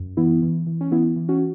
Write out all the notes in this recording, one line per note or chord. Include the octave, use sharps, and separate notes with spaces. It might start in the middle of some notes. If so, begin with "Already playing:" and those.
Already playing: F#2
E3 B3 E4
E3
E3
C#4
E3 B3 E4
E3
C#4 F#4